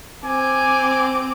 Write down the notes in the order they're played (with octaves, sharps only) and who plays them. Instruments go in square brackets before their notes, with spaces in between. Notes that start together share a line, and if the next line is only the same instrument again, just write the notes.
[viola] C4 D6 [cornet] G#5